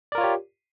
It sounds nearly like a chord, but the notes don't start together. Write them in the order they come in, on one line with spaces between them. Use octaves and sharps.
D5 A#4 F4 C#5 G4